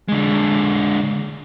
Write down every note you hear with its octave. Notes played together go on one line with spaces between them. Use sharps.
D3 G#3